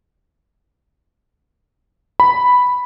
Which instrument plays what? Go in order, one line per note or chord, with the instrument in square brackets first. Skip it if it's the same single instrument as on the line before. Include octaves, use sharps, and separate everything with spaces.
[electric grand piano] B5